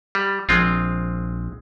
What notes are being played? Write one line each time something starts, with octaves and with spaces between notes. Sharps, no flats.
G3
A#1 G#3 C4 F4